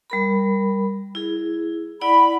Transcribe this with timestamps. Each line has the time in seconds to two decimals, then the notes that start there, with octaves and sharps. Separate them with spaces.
0.10 G3 A#4 B5
1.15 E4 G#4
2.01 E4 D5 F#5 B5